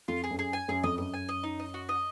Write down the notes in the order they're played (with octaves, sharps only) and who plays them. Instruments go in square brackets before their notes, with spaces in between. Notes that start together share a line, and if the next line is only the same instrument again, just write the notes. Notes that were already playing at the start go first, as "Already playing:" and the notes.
[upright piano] F2 [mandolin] F4
[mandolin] G#4
[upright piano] F#2
[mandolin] G#4
G#5
[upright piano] F#2 [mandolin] G#4
[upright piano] F2 [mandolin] D#5
[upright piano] F#2 [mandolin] D#5
[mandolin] G#5
D#5
D#4
D#5
F#4
D#5